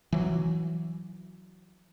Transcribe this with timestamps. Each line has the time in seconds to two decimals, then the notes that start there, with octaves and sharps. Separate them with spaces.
0.13 E3 F#3